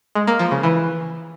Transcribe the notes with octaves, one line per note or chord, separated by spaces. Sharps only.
G#3
A#3
F3
C#3
E3